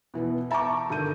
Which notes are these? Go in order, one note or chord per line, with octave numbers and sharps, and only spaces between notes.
B2 E3 B3 B4
E5 A5 A#5 C#6 D6
G2 D3 D#3 G6 D#7